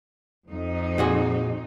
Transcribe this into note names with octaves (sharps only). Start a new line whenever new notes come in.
F2 D#4
A#2 F#4 G#4